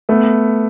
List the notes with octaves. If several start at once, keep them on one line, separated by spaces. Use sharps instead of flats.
A3 B3